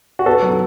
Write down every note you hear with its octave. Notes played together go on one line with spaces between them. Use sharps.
F#4
B3 A4
F#3